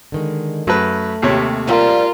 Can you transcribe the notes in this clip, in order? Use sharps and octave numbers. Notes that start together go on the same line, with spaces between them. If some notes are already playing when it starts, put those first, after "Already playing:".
D3 D#3 G#3
F#2 A3 B4
D#2 C3 C#5
F3 G3 F4 A#4